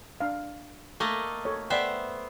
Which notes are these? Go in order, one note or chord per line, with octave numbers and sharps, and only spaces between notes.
D4 F5
A3 A#3 D#5
A4 C#5
B3 C5 D5 E5 G5